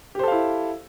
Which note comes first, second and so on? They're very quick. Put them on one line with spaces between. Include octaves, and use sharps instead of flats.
G4 C5 A4 F5 E4